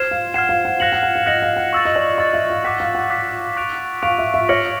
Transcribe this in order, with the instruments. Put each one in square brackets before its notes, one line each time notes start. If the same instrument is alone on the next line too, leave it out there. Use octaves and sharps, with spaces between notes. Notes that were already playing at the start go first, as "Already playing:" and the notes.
Already playing: [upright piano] C5 [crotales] F6 G#6 C7 E7
[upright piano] F5
[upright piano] F#5 [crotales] F6 G#6 C7 E7
[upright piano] F5
F#5
[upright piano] F5 [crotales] F#6 A#6 C#7 F#7
[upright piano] F#5
F#5
F5
[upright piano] D#5 [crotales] F#6 A#6 C#7 F#7
[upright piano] F5
F#5
[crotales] C#6 E6 A6
[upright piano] D#5
D5
[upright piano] D#5 [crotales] C#6 E6 A6
[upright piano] E5
F5
[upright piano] F#5 [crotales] D6 F#6 B6
[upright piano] F5
F#5
[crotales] D6 F#6 B6
C#6 F#6 B6 D7 F7
[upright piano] F5 [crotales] C#6 F#6 B6 D7 F7
[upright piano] E5
E5
[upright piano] C#5 [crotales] D6 F6 A#6 C#7 F#7